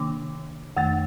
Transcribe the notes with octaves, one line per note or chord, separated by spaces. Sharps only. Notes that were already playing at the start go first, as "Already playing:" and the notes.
Already playing: C3 D#3 A#3 D4 D6
F2 D#3 A3